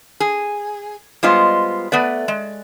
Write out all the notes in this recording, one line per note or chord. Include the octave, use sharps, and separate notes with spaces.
G#4
G3 G#3 B3 F4 C5 D#5
A3 B3 B4 D5
G#3